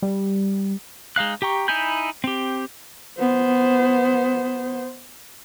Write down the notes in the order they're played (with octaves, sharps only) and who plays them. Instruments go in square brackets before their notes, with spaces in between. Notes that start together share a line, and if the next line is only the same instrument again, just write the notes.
[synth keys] G3
[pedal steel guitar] G#3 D#4 F5 F#6
G4 G5 A#5 C#6
D#4 E4 G#5 B5 G6
C4 G4
[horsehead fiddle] B3 C5